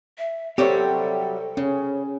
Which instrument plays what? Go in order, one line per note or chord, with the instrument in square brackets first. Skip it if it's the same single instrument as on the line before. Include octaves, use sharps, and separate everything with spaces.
[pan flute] E5
[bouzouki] F#3 G3 E5 [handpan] C4 [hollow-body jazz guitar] G4 C#5 [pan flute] A4
[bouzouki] C#3 [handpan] C#4